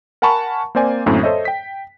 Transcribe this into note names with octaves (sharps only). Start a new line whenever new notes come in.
A#4 F#5 G#5 A5 B5 C#6
A#3 C4 C5 D5 G#5
F#2 A2 D3 A#3 C4
A4 C5 C#5 D#5 E5
G5 B6